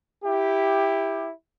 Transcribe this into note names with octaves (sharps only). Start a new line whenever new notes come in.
E4 G4